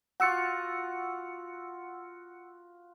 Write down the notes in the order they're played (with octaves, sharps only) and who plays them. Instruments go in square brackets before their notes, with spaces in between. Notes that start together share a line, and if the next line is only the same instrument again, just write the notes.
[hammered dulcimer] F4 F#4 [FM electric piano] F#5 E6 C#7